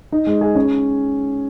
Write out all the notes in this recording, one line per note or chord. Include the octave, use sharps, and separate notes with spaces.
D#4
G#3
G#4
C#4